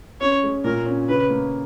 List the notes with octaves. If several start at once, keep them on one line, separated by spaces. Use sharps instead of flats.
C#4 C#5
G#3
A#2 A#4
C#4
C#3 B4
A#3